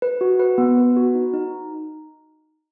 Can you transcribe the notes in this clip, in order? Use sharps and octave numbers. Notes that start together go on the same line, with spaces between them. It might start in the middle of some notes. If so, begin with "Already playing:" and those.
B4
F#4
B4
B3
B4
F#4
D#4
D#4